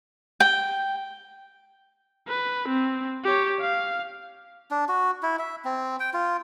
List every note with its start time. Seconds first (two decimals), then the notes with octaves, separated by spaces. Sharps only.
0.40 G5
2.28 B4
2.68 C4
3.25 G4 C#5
3.60 F5
4.71 D4
4.89 F#4
5.23 E4
5.39 E5
5.65 C4
6.00 G5
6.14 F4